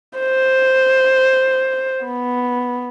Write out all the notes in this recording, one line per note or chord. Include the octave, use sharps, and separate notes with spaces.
C5
B3